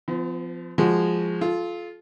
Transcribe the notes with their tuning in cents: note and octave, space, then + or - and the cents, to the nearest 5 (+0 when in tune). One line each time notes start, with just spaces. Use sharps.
F3 -10 B3 +45
F3 +0 G#3 -10 F#4 +0
F4 +0 A4 -40